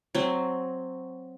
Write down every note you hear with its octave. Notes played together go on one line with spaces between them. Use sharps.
F#3 C4